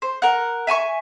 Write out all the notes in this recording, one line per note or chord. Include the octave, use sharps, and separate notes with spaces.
C5
A#4 F#5
E5 G#5 B5 C#6